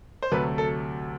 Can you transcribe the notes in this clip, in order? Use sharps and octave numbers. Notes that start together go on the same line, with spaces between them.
C5
D2 C3 F#3 A3 B4
A4